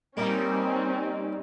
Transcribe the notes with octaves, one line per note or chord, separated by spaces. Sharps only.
G3 A#3 C4 C#4 D#4 A#4